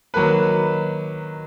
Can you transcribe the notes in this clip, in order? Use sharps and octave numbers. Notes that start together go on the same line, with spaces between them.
D#3 F#3 A#3 B4